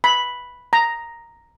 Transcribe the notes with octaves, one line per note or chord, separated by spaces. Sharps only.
B5
A#5